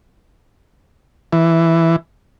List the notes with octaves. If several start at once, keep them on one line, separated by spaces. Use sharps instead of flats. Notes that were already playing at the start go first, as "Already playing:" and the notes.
E3